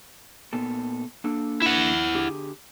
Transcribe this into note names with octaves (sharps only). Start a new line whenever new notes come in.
A#2 B3 A4
A#3 D4 A4
E4 F#5
D3 G4 G#4